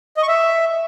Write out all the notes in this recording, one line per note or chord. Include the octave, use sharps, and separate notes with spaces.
D#5
C#6
E5